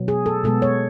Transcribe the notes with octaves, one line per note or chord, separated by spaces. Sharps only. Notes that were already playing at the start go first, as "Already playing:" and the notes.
Already playing: B2 F#3 B3
G#4
A4
B2 G#3 B3 A4
C#5